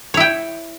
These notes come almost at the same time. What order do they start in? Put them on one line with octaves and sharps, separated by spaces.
C#5 E4 G5